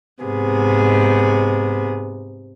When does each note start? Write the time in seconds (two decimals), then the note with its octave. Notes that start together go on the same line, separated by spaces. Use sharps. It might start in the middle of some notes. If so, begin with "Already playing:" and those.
0.23 G#2 C3 B3 G#4